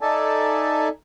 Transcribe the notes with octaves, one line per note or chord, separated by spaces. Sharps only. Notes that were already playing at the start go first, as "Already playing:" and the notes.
D#4 A4 D5 E5 G#5 A5